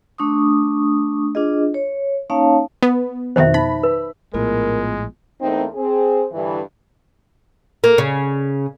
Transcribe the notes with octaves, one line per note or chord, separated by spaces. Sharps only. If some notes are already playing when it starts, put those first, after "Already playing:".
A3 D4 C#6 D#6
D4 F4 G#4 D#5
C#5
A#3 C#4 D#4 C#5 F5 A5
B3
F2 B2 D#3 C5 E5
D#4 B5
B4
A#1 A2 G#3 B3 F4 A#4
E2 A3 A#3 C4 D#4
C4 G#4
G2 D3 E3
A#3
C#3